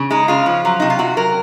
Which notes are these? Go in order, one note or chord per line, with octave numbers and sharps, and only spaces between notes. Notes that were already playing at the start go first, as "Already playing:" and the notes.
Already playing: C#3
G#3 D#4
C#3 F4
F3
F#3
C3 D#4
F4
C3 F#4
F#3 A#4